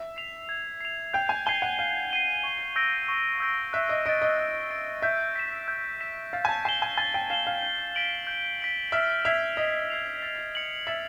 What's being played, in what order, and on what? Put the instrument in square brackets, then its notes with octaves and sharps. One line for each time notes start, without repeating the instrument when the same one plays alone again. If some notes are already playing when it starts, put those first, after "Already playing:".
Already playing: [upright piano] E5
[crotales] C7 F7
G#6
C7 F7
[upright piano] G5 [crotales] G6
[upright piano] G#5
[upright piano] G#5 [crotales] C7 D#7 G7
[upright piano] F#5
[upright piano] F5 [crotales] G6
[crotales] C7 D#7 G7
C#6
E6 G6 A#6 D7
C#6
E6 G6 A#6 D7
[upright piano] E5 [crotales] F#6
[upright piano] D#5
[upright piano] D#5 [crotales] A6 D7
[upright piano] D#5
[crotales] F#6
A6 D7
[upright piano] E5 [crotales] G6
[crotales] B6 E7
G6
B6 E7
[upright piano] F5 [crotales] A6
[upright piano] G#5
A5
[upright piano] G#5 [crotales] C7 E7 G7
[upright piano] G#5
[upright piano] G#5 [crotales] A6
[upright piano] G5
[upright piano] F5 [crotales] C7 E7 G7
[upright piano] F5
[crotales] G6
B6 D7 F#7
G6
B6 D7 F#7
[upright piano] E5 [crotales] F6
[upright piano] E5 [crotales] G#6 C7 F7
[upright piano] D#5 [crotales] F6
[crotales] G#6 C7 F7
A6
C#7 F#7
[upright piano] E5 [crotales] A6